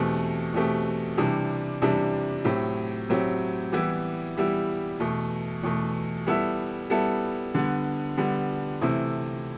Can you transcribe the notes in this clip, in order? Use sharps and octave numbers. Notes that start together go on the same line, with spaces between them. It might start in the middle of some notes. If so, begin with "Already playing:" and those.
Already playing: E2 B2 A3 C4 G4
E2 B2 A3 C4 G4
C3 E3 G3 D4 G4
C3 E3 G3 D4 G4
A2 F#3 C4 G4
A2 F#3 C4 G4
E3 G3 B3 E4 G4
E3 G3 B3 E4 G4
E2 B2 A3
E2 B2 A3
G3 B3 E4 A4 E5
G3 B3 E4 A4 E5
D3 G3 B3
D3 G3 B3
C3 E3 A3 C4 E4